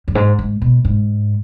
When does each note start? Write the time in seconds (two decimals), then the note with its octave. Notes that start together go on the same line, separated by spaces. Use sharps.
0.08 F#2
0.15 G#2
0.39 G#2
0.62 B2
0.85 G#2